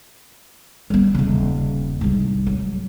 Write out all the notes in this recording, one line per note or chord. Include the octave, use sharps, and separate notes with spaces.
G3 B3
D#1 C#3
C2 G#2
F#3